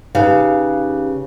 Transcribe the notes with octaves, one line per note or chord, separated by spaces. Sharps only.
C#3 D#4 G4 B4 F5